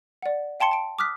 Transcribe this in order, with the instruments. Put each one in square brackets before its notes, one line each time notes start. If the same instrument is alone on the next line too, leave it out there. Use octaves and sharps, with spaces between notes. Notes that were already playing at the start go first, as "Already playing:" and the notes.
[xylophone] D5 F#5
F5 G5 A5 C6 C#7
A5 D7
D6 D#6 F6 F#6 B6